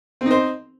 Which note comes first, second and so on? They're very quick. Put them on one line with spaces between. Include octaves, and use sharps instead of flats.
C4 D#4 C5